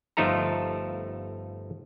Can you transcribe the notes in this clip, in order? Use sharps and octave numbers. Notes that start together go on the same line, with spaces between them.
G1 F3 A3 D#4 A4 A#5